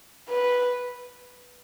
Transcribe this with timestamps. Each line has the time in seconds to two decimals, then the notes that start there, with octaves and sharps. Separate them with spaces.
0.29 B4